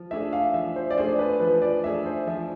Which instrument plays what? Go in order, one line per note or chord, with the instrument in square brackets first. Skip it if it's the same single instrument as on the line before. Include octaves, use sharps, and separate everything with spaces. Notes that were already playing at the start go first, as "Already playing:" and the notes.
Already playing: [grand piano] F3
[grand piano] A3 D4 G#4 [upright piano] E5
[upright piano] F5
[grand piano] F3 [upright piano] E5
[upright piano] C5
D5
[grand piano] A3 D4 G#4 [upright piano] C5
[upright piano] B4
[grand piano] F3 [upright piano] B4
[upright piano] D5
[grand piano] A3 D4 G#4 [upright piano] E5
[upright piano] C5
[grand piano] F3 [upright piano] E5